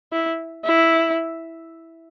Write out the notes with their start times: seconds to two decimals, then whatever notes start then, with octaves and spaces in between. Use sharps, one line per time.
0.13 E4
0.65 E4